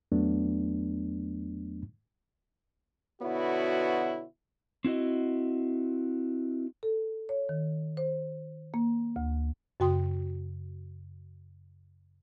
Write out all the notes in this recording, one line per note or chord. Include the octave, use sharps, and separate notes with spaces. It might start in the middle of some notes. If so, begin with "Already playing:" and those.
E2 F#3 A3 B3 D4
B2 D3 B3 E4 F#4 C#5
C4 E4 F#4 D#5
A4
C#5
D#3
C5
A#3
D2
F#2 C#3 F#4 G5 C6 D#6